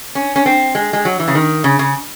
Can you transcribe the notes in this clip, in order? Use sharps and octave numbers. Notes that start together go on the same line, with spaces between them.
C#4
C#4
C4
G#3
G#3
F#3
E3
C#3
D#3
C#3
C#3